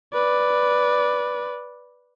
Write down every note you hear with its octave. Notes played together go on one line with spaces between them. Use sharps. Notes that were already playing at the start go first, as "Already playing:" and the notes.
B4 D5